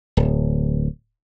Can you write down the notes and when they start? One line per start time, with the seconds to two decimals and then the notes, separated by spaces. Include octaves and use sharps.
0.17 D1